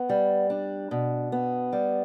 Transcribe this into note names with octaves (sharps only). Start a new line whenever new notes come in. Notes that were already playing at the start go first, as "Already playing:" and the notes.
Already playing: B3
G3
D4
B2
B3
G3